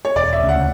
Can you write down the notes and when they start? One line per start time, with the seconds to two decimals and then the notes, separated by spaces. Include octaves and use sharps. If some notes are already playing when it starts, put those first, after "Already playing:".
0.05 C#5
0.16 E1 D5
0.33 E5
0.40 D2 C#3
0.49 F#5